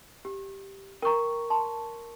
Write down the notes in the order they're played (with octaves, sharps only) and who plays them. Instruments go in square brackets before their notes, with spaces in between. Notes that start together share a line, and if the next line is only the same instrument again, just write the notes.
[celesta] G4
[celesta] A#4 C#6 [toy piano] G5 A#5
[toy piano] A5 C6